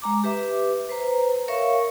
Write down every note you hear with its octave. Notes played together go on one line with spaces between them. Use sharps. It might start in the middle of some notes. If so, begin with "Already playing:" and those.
G#3 A#5 D6
G4 B4 E5 D6
B4 C5 A#5
A#4 C#5 E5 F5 C#6